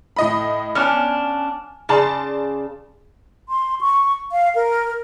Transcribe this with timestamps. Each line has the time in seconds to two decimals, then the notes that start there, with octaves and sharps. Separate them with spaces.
0.16 A2 D#5 B5
0.75 B3 C#4 D4 G#5 F6
1.89 C#3 D5 A5 C6
3.49 C6
3.81 C#6
4.32 F5
4.55 A#4